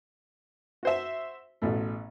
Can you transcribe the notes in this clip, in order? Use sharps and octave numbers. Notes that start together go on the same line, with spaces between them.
F#4 C5 E5
A1 B2 A3